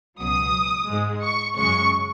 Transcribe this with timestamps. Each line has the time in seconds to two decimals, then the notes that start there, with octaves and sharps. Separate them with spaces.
0.20 C#2 B2 F#3 D#6
0.89 G#2 G#3
1.23 C#6
1.57 F#2 C#3 G#3 C#6